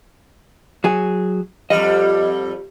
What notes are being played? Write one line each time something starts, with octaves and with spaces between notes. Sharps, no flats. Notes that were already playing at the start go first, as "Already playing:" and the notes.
F#3 G#4
F2 G3 D#5